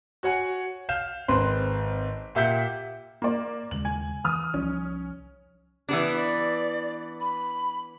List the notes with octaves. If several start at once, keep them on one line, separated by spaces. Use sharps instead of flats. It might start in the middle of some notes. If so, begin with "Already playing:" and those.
F#4 C#5 F#5 G#5
F5 G6 E7
G#1 C4 B4 C6
A#2 G4 E5 F#5 G6 B6
A#3 D5
D#2 C#3 G#3 F#7
G#5
E3 D#6 F6
C2 F3 C#4
E3 B3 D4 G4
D5
B5